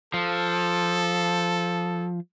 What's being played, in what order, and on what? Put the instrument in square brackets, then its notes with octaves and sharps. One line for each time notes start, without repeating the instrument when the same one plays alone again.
[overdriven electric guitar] F3 [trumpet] A4